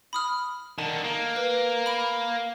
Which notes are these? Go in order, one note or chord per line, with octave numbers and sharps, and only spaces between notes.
B5 D#6 F6
D3 D#3 A5
A#3
B4
B5 D7